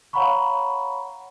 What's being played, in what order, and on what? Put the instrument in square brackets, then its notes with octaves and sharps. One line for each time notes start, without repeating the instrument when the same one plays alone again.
[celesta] C#5 F5 F#5 A#5 B5 C#6